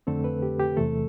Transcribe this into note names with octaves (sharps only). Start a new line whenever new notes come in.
F2 D3 A3 C4 A4
B4
G4
G4
E2 C3 E3 A3 A4